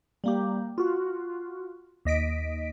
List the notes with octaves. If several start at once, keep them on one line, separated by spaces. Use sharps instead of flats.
G3 A#3 G4
F4 F#4
D#2 D#5 B6 D7